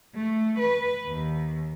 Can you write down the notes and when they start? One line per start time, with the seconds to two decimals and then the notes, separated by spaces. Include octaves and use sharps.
0.16 A3
0.59 B4
1.07 D#2